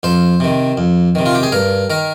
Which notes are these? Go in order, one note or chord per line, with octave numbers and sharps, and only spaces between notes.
F2 C5
C3 D#3
F2
C3 D#3
F4
G4
G#4
G2 A#4
D#3 A#4